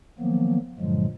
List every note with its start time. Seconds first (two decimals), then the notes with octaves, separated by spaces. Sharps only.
0.19 D#3 F3 F#3 A#3 B3
0.78 G2 A#2 D3 F3 F#3 G#3